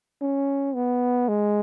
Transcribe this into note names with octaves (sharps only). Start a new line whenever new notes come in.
C#4
B3
G#3